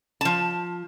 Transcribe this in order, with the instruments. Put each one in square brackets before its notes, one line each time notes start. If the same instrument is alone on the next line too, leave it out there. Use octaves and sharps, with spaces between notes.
[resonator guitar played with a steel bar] F3 A5